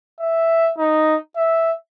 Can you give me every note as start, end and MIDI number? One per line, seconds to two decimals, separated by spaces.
0.20 0.71 76
0.78 1.16 63
1.36 1.72 76